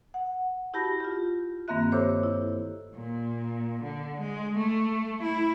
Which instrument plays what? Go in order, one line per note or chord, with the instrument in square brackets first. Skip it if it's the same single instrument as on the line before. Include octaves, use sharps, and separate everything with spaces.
[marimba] F#5
E4 F#4 G4 A5 B5 A#6
F4 G4
G2 D#3 A#3 C4 E5 F#6
G4 A4 C5 C#5 D6 E6
E4
[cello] A#2
D3
G#3
A3
E4